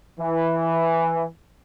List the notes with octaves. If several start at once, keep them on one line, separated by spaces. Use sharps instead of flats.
E3